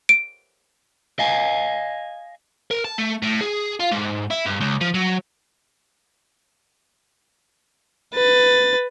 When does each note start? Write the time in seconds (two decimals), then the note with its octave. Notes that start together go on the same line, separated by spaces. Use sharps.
0.09 D7
1.19 D#5 F5 G#5
2.71 A#4
2.84 A5
2.98 A3
3.22 A2
3.41 G#4
3.80 F4
3.92 G#2
4.31 E4
4.46 G2
4.61 C#2
4.81 F3
4.94 F#3
8.15 B4 A6